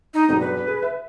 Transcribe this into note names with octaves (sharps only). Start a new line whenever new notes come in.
D#4
B1 E2 G2 D#4
B4
G#4
E5